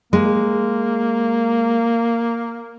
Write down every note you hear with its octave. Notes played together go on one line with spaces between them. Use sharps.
G#3 A#3